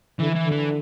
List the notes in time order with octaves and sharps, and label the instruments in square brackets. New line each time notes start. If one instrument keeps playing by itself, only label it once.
[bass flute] D3 [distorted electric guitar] E3
[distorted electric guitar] E3
[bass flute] D3
[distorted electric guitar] E3